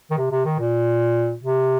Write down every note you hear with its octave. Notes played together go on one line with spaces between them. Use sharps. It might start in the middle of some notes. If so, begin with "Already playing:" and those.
D#3
C3
C3
D#3
A#2
C3